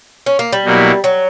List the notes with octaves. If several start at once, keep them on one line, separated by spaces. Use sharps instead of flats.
C#4
A#3
G3
B2 F#3 A#3 E4
F#3